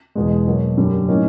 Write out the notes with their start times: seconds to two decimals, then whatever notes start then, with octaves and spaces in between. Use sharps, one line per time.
0.15 E2 B2 G#3
0.47 B2 F#3 A#3
0.77 F#2 D3 G3 A#3
1.08 A2 F#3 A#3 C#4 D#4